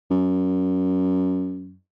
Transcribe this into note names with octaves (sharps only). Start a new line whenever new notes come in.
F#2